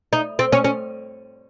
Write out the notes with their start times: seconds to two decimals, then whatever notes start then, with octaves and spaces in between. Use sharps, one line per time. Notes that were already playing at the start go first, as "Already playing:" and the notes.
0.13 D#4
0.39 C4
0.52 C#4
0.64 C#4